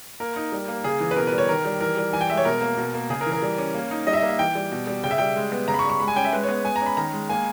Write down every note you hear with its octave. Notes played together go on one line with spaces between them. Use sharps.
A#3 A#4
D#4
G3
A#3
C#3 G#4
E3
B4
B2 A#4
B4
G3
C#5
D#3 A#4
G3
E3 A#4
G3
E3 G#5
G5
G#3 E5
C#5
B2 A#4
A#3
B2
A#3
C#3 G#4
A#4
E3
A#4
G3
C#4
A#3
D#4
G3 D#5
E5
D#5
A#3
E5
E3 G5
G3
B2
G3
C#3 G5
E5
G3 G5
G#3
B3
C#3 A#5
B5
C#6
G3
C#6
G#3 B5
G#5
C#4 G5
E5
G#3 B4
C#5
B3
G#3 G#5
A#5
C#4
B5
D#3 A#5
G#3
A#3 G#5